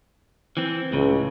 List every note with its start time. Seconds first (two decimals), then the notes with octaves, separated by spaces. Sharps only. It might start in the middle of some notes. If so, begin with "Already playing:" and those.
0.57 E3 C4
0.93 C#2 A2 C#3